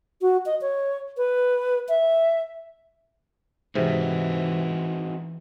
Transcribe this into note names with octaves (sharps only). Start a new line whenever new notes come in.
F#4
D#5
C#5
B4
E5
G#2 C3 E3 C4 D#4 F#4